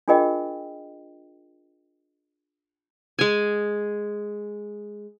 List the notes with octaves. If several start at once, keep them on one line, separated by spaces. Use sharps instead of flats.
D4 F4 G#4 A#4 D#5 G5
G#3 G#5